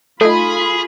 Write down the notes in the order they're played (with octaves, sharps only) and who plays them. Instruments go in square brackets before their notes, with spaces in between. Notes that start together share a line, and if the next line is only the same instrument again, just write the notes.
[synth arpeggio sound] A3 D#4 [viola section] F4 B5 [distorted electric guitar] G#4 [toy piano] A4